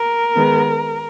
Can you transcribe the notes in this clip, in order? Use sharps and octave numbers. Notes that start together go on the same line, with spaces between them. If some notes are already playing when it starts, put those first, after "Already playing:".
Already playing: A#4
D#3 G#3 B3